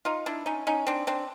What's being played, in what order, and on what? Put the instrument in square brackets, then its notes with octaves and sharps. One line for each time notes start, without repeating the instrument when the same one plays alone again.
[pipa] D#4 F4
D4 E4
C#4 D#4
C#4 D#4
C4 D4
C4 D4